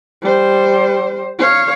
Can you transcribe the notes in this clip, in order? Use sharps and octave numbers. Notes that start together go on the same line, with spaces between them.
G3 C5
C#5 F5